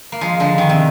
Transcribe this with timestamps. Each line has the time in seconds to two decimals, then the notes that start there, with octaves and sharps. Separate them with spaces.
0.12 A#3
0.21 F3 G#3
0.40 D3 F3
0.58 D#3
0.69 C3